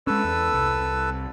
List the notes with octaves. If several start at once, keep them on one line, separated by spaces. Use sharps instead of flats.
G#3 C#4 A4 B4 E6
E2
C2